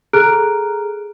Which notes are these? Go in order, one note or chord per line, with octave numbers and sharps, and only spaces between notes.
G#4 A4 A#5 F6 F#6 D7